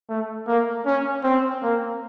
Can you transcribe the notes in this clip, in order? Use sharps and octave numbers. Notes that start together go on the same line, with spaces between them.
A3
A#3
C#4
C4
A#3